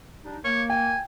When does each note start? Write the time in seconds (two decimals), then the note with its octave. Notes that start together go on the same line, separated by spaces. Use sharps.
0.25 G3 D4 D#4
0.45 A#3 C#5
0.70 G5 G#5